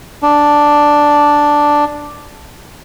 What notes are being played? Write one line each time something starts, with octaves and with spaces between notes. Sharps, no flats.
D4